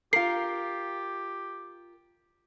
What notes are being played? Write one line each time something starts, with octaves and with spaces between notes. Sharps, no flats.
F4 G4 A#4 C7